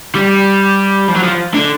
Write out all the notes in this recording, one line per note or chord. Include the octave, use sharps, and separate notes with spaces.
G3
F3
F#3
F3
D3